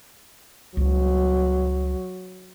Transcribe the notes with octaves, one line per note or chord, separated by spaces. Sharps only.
C#2 F#3 G3